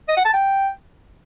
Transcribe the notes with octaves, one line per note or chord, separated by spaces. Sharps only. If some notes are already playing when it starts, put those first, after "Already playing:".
D#5
F#5
A5
G5